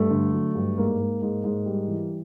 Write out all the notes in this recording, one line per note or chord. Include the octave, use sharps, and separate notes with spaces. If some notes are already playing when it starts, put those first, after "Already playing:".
Already playing: G2 A3
D3
F#3
G2
G#2 A#3
G#2
G#2
G#2
G3
E3